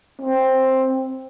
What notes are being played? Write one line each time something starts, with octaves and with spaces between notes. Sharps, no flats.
C4